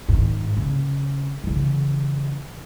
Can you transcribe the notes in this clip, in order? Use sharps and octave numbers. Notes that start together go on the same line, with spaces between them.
G#2 D#3
C#3
C#3 E3